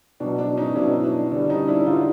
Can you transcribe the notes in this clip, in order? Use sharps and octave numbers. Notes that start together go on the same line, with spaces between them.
B2 D4
F#3
D4
C#4 D#4
B2 F#3 D4 E4
D4
D3 G3 D4
C#4 D#4
D4 E4
D3 G3 D#4 F4